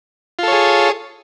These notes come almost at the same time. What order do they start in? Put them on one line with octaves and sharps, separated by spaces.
F4 A4 C#5 G#4